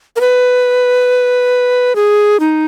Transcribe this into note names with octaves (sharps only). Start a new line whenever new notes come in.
A#4
B4
G#4
D#4